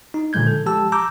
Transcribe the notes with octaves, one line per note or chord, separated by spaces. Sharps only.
D#4
A#2 D3 F3 G#3 G6 G#6
A4
F3 G#3 G4 A5 E6
A#5 D6 E6 G6